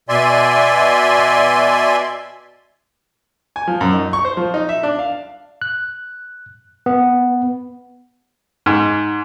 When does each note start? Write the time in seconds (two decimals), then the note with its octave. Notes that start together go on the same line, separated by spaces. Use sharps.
0.09 B2 D5 E5 G#5 C6
3.56 G#5
3.67 F3
3.81 F#2
3.93 D#4
4.13 C#6
4.25 C5
4.37 F3
4.54 D#4
4.69 E5
4.83 D4
4.99 F5
5.62 F#6
6.86 B3
8.66 G#2